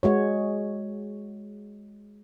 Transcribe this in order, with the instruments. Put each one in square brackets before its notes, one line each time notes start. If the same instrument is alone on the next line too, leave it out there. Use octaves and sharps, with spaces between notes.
[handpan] G#3 F#4 C#5